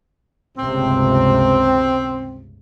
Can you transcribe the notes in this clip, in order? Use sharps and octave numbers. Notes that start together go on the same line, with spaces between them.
G1 C#2 C3 C4